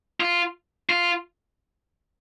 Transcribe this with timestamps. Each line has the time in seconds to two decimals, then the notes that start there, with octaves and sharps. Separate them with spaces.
0.20 F4
0.89 F4